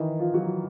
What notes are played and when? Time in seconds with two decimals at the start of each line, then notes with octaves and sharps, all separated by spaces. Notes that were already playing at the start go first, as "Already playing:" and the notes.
Already playing: D#3 E3 D#4 E4
0.19 F3 F4
0.34 F#3 F#4